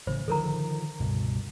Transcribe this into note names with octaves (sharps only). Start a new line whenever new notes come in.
A1 C#3 C5
D3 D#3 F3 A4 A#4 A#5
C#2 G2 B2